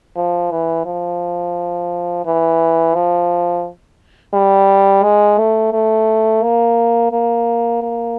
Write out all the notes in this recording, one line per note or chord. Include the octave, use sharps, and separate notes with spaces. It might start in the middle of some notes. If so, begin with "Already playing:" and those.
F3
E3
F3
E3
F3
G3
G#3
A3
A3
A#3
A#3
A#3